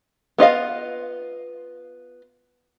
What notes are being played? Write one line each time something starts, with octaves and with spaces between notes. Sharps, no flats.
B3 F4 D#5 F5